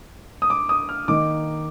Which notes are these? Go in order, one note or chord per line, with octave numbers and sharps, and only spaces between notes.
D#6
D6
D#6
F6
D#3 A#3 D#4 D6